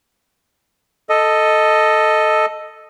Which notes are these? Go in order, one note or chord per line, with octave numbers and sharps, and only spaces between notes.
A4 D#5